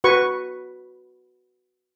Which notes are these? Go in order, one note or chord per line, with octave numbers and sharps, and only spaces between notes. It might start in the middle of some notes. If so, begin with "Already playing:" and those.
F#4 B4 C#6